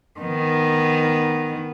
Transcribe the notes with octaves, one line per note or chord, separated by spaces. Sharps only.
D#3 B3